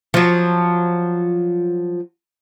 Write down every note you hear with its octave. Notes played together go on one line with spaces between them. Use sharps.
F3 F#3